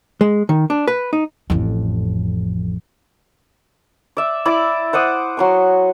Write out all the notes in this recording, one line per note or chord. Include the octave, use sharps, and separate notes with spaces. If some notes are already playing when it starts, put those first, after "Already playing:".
G#3
D#3
D4
B4
D#4
A1 F2
D5 E5
E4 D5 D6
C5 F#5 D6 D#6
F#3 C6 C#6